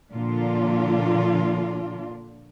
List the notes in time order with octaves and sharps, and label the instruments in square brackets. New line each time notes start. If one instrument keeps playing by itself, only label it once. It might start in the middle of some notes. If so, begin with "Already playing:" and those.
[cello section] A#2 D3 F3 A#3 D4 F4